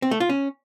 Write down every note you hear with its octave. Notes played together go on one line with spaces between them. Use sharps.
C4
A3
F4
C#4